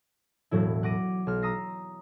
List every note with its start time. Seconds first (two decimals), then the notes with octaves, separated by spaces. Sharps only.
0.51 E1 A2 F#3 E4
0.83 F#5 D6 A#6 D#7
1.27 B1 F6
1.42 A#5 D#6 E6 A#6 C7